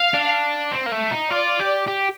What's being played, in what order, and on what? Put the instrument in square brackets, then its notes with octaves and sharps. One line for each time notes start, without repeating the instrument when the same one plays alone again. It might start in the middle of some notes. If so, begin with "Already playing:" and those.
Already playing: [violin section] F5
[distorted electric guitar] D4
C4
A#3
A3
D#4
[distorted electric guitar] F4 [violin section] D5
[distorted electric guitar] G4
G4